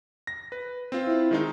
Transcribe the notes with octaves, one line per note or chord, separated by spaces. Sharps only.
A#6
B4
C4 F4
E4
D#3 G#3 D#4